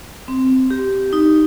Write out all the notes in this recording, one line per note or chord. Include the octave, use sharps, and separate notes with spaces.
C4
G4
D#4